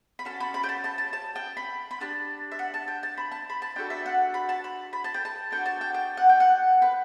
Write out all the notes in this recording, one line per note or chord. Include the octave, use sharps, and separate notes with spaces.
B5
C#4 F#4 A4 A5
B5
B5
G5
A5
A5
A5
A5
G5
B5
B5
D4 G4 A5
E5
F#5
A5
G5
A5
B5
A5
B5
A5
D4 F#4 A4 G5
E5
F#5
B5
A5
B5
B5
A5
G5
A5
B3 D4 F#4 A4 G5
A5
G5
G5
F#5
G5
F#5
B4